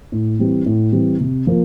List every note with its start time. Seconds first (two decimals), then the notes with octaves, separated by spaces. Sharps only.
0.12 A2
0.39 E3 G3 C4
0.66 A2
0.92 E3 G3 C4
1.20 C3
1.47 F3 A#3